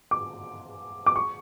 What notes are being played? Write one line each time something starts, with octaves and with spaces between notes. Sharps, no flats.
D6
D6
C#6